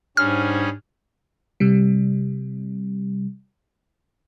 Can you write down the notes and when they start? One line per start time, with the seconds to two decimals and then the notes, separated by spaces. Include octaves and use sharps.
0.17 G#2 G3 C#4 D4 G#4 F6
1.60 C3 G3